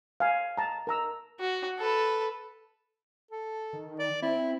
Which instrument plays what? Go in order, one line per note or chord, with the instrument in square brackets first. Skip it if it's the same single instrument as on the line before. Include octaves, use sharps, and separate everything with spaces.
[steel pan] F5 G#5
A5 A#5
A#4 A#5 E6
[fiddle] F#4
A4 B4
[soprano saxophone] A4
[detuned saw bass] D#3
[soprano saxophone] D5
[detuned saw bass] C4 [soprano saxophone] E4